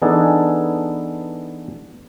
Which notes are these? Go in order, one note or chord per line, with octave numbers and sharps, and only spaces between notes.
E3 B3 D4 D#4 G#4 A4